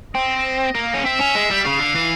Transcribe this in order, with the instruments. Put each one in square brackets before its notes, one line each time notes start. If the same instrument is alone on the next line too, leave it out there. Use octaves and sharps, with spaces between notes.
[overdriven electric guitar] C4 [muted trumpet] D#5
[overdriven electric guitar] A#3
C#4
[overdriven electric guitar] C4 [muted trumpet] E5
[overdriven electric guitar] C#4
G#3
G3
[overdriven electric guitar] C#3 [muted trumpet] F5
[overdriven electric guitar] D3
E3